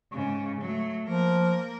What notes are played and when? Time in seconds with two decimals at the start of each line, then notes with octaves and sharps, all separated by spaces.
0.12 G#2 C#3
0.61 F#3 A3
1.07 F3 A#3 A#4